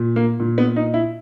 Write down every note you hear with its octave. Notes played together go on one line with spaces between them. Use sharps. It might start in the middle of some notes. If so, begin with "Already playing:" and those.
Already playing: A#2
A#3
A#2
B3
D#4
E4